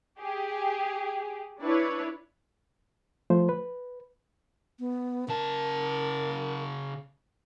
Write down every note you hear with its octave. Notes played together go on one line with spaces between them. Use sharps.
G4 G#4
D4 E4 B4 C#5
F3 A3 C5
B4
B3
C#3 A#4 A5